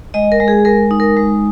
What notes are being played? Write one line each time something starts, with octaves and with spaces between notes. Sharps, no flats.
G#3 D#5
A#4
G#3
G#4
G#3 A#4
D#4
A#4
G#3